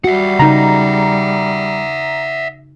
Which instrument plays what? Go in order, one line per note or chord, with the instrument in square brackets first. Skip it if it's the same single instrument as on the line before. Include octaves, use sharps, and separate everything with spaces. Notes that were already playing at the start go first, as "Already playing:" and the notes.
[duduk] G3 [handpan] F#4 [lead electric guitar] E5 F#5
[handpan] C#3 D#4 [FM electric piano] A#5